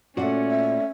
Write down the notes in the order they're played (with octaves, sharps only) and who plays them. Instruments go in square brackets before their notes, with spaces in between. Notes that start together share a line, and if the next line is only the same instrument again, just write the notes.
[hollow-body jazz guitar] A#2 F#4 [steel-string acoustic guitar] A3 D5 F#5 [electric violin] C#4
[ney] E5